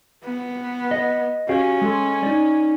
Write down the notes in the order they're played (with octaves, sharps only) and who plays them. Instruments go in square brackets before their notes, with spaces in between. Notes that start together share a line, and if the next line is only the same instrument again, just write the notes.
[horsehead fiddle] B3
[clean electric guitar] D#5
[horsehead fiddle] C#4 [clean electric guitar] F#4 G4 F5
[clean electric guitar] G#3 A4 C6
D#4 D5